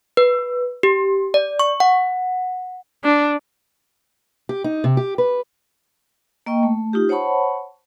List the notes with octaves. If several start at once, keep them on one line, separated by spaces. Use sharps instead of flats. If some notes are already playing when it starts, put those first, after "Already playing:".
B4
G4
D5
C#6
F#5
D4
G4
D#4
C3
G4
B4
A#3 D#5 G5 C#6
A3
D#4 F4 G4
C5 C#5 F#5 A5 B5 C#6